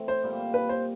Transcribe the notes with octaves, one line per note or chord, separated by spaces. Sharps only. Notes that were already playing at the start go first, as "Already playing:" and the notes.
Already playing: E3 A3 C4
C5
A#2 G3 A#3
B4
C5